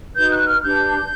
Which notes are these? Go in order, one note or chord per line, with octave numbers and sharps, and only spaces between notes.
D#4 F#4 B4 G6
F#6
F6
D4 G4 B4 G6